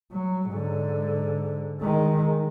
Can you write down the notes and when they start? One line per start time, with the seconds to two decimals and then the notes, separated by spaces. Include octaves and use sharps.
0.12 F#3
0.49 G#2 D3
1.81 D#3 G#3